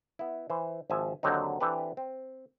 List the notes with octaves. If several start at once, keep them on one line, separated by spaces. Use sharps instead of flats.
B3 E4
E3 C5
G#1 F3 E5 G#5 A5
D#2 D3 F#3 C4 D#4
E3 C4 D4 G4 A4 B4
C4